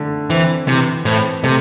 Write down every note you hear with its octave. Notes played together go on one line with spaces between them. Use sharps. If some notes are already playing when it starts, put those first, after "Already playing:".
Already playing: D3 A3
E3 C4
C3 E3
A2 C4
C3 A3